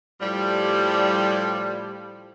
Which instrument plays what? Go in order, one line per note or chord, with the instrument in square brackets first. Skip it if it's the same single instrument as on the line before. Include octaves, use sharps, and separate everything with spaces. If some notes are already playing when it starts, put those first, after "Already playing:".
[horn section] A2 F3 G3